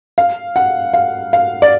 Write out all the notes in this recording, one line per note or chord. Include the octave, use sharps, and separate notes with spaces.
F5
F#5
F5
F5
D5